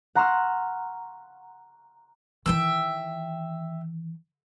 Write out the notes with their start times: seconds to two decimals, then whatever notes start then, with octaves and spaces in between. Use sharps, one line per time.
0.15 F#5 A#5 C6 C#6 E6 F6
2.46 D#3 E3 E5 G5 E6